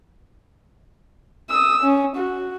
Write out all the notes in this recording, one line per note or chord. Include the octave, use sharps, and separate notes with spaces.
D#6 E6
C#4
F#4